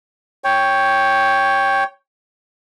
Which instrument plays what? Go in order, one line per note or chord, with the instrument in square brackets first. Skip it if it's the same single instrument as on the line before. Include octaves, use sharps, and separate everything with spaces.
[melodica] C#5 G5